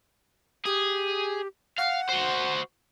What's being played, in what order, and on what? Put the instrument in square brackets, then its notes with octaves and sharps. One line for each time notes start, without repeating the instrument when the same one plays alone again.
[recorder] G4 [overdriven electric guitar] G#4
[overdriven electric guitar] F5 [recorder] F#5
[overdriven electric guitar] F#4 C5